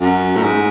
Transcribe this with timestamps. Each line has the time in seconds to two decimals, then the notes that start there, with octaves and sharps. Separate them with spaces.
0.01 F#2
0.36 A2
0.43 G#2